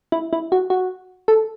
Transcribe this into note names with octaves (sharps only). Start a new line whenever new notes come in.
E4
E4
F#4
F#4
A4